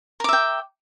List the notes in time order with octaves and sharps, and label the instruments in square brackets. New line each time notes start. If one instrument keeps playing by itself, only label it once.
[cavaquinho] A#4
D6
E5
G5